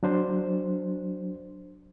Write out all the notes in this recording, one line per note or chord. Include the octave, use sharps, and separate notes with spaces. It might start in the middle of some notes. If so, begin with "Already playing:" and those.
F#3 D4 C5